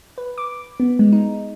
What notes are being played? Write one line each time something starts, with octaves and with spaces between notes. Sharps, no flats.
B4
D6
B3
G#3
D#4